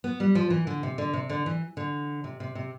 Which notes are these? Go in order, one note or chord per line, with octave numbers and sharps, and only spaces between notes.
B3
G3
F3
E3
D3
C3
D3
C3
D3
E3
D3
C3
C3
C3